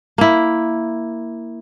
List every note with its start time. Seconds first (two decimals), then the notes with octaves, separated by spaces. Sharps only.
0.18 A#3 E4